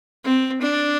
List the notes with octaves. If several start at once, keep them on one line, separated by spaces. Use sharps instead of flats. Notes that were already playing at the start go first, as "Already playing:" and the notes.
C4
D4